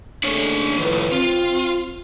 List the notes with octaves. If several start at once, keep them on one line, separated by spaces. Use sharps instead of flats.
D#2 C#3 A3 D4 C#5
A2 D#3 F3 B4
C4 F4